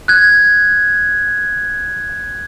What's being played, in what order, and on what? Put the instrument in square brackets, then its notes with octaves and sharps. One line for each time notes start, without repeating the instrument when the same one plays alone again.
[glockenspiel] F#6 G#6